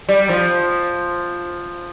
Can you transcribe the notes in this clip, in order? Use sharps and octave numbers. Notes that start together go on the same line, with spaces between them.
G3
F3